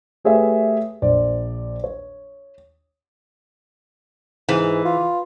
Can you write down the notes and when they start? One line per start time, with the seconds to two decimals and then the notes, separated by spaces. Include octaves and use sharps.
0.24 A3 G4 G#4 B4 C#5 E5
1.02 A#1 C5 D5
1.84 C#5
4.49 G#2 E3
4.85 F4